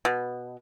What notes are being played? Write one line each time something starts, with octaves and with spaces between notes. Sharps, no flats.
B2